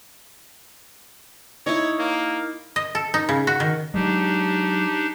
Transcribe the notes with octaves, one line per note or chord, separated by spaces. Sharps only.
D#4 E4 C#5
A#3
D#5
A4
D#4
C#3
F#4
D#3
F#3 G#3 D4 D#4 G4